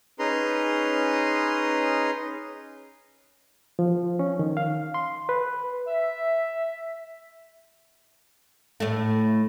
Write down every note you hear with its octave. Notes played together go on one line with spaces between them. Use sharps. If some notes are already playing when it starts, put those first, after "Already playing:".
C#4 D#4 G#4 B4 A#5 C6
F3
C#4
D#3
F5
C6
B4
E5
A2 A3